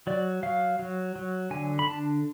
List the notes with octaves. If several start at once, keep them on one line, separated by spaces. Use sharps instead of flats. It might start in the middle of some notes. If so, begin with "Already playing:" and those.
F#3 D5
F#3 F5
F#3
F#3
D3 G#5
B5
D4 A5